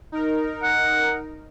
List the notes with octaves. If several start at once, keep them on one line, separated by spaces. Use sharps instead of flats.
D#4 A#4
F#5